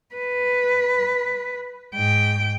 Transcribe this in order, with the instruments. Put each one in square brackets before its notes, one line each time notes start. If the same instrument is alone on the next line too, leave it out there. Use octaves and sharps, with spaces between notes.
[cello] B4
G#2 G5